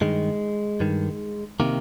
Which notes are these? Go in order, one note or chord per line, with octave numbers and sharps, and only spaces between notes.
G2 D#3 G#3
G2 D#3
C3 D#3 A#3